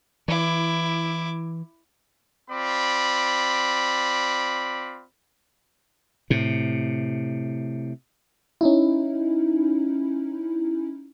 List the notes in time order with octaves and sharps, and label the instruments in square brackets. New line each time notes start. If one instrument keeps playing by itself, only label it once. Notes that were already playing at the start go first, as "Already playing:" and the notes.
[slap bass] E3 [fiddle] E4 D6
[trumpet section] C4 F4 D5 B5
[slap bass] A2 C3
[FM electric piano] C#4 D#4 E4